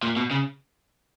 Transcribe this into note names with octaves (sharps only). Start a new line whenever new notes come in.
A#2
B2
C#3